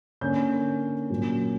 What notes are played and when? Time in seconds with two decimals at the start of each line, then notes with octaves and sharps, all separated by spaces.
0.21 D3 A#3 C#4 G6
1.10 A#2 F#3 A#3 C#4